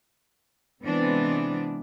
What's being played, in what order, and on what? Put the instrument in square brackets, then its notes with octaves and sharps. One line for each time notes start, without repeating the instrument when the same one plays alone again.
[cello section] C3 E3 G#3 B3 C4 D4